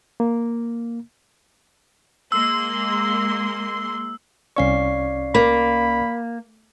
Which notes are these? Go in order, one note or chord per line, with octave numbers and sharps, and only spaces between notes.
A#3
G#3 A#3 C6 E6
C2 C#4 D5 F5 C#6 C7
A#3 B5